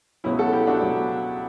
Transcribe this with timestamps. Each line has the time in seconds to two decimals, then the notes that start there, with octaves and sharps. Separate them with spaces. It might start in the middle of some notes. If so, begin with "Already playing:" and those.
0.24 C#2 B2 F#3 C#4 E4
0.39 F#4 A4
0.53 E4 G4
0.67 D4 F#4
0.81 C#2 B2 F#3